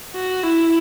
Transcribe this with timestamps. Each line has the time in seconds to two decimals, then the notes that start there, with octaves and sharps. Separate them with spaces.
0.15 F#4
0.43 E4